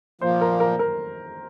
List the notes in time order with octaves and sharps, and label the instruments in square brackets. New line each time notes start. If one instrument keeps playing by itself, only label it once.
[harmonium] A#2 F3 A#3 [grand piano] C5
[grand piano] A#4
A#4
A#4